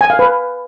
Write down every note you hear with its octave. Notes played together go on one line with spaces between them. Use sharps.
G#5
F5
B4